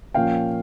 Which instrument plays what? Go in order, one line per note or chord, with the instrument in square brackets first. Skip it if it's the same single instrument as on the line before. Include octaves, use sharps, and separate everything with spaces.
[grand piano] A#2 F3 A#3 C#4 F5 G5